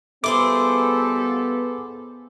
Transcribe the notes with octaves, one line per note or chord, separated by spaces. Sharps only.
G3 B3 E4 F4 G#4 A4 C5 D6